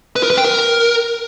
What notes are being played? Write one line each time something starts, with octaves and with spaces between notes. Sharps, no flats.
B4
A#4
B4
G5
A#4